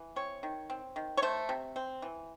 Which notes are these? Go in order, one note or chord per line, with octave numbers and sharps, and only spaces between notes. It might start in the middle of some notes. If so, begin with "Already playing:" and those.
Already playing: E3
C4 C#5
D#3
C4
D#3
C#5
A3 C5
C3
C4
E3